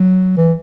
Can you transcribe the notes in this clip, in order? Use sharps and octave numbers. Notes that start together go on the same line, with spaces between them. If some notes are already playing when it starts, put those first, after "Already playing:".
Already playing: F#3
E3